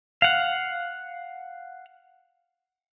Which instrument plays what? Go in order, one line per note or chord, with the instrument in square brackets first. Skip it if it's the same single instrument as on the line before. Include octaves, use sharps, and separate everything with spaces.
[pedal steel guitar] F5 F#5